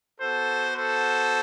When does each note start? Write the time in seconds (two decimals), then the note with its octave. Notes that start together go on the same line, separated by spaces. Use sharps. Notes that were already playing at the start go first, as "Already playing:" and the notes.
0.21 B3 F#4 A4 C5
0.75 A4 C5